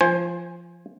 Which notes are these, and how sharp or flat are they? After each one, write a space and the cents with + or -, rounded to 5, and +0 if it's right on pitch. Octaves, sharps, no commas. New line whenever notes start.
F3 -15 C5 +20 G#5 +0